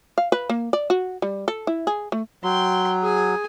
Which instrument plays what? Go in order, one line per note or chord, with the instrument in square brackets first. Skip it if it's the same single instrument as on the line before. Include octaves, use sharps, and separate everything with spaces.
[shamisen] F5
B4
A#3
D5
F#4
G3
A4
E4
G#4
A3
[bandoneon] F#3 [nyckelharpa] G5 C6
[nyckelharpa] G#4 G#5